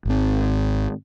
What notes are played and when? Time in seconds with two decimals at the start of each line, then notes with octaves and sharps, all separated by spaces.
0.05 G#1 C4